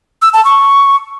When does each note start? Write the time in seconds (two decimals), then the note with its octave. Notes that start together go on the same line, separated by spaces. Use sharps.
0.22 E6
0.33 A5
0.45 C#6